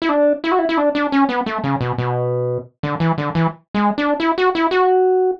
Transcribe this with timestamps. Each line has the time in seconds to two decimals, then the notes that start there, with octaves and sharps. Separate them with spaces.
0.02 E4
0.09 D4
0.44 E4
0.52 F#4
0.59 E4
0.69 E4
0.78 D4
0.95 D4
1.12 C#4
1.29 B3
1.46 A3
1.64 C#3
1.81 B2
1.98 B2
2.83 D3
3.00 E3
3.18 D3
3.35 E3
3.74 G#3
3.98 D4
4.20 E4
4.38 F#4
4.55 E4
4.71 F#4